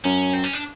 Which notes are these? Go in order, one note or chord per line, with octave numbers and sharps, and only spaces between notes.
F#2 C#4
C4
C#4
D4